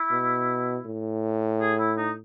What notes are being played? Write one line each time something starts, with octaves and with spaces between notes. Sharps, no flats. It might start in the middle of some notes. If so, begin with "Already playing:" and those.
Already playing: E4
B2
A2
G#4
E4
D#4